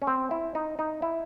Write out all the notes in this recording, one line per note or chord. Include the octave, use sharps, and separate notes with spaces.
C#4
C4
E4
D#4
D#4
E4